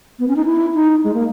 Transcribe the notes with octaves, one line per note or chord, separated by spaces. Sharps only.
B3
C#4
D#4
E4
D#4
G#3
A#3